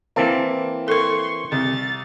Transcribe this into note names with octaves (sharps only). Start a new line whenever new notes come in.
E3 A#3 C4 A5
A4 A#4 C6 C#6
C2 A6